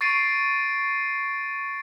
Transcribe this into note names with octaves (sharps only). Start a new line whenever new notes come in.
C#6 A6 C7 D7 D#7